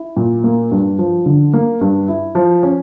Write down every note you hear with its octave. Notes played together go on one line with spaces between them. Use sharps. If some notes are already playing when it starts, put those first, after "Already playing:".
Already playing: E4
A#2
A#3
G2
F3
D3
A#3
G2
E4
F3
C#4